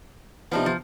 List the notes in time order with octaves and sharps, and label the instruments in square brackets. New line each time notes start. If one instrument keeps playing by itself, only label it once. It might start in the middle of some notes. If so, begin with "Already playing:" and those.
[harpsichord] C3 B3 [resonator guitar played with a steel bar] F3 D4 D#4
[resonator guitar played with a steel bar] F3